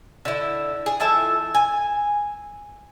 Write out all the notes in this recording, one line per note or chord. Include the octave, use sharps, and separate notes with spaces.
D3 E4
G#4
F3 E4 A4 E5
G#5